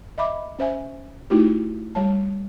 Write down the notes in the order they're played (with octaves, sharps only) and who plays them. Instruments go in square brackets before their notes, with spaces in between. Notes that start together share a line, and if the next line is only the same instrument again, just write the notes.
[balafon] D#5 E5 B5 D6
C#4 C5 E5 G#5
A3 D#4 E4 F#4 G4
G3 C#5 A5